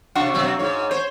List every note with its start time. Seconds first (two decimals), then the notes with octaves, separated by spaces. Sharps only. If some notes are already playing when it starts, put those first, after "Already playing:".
0.15 C3 D4 F#4 F5 C#6
0.34 B2 F#3 C4
0.59 G#2 C#5
0.91 C5 C#5